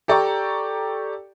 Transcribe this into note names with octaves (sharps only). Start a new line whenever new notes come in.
G4 A4 D5 G5 A#5 C#6